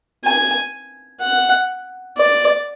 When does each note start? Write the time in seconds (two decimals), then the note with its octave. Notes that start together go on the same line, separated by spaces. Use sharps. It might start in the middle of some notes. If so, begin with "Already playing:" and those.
0.25 G#5
1.21 F#5
2.17 D5